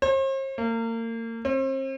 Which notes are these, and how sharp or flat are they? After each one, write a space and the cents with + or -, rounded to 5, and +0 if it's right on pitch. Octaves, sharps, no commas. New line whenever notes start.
C5 +45
A#3 -35
C4 +40